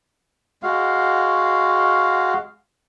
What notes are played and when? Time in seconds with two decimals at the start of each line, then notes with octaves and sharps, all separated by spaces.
0.63 G#3 F#4 F5